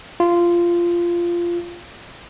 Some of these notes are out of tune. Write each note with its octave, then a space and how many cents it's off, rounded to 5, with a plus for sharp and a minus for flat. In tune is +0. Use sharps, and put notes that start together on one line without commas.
F4 -15